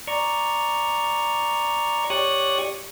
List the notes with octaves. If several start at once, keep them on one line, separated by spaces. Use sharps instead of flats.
D5 A#5 C#6
G4 C#5 D5 C#6 D#6 F#6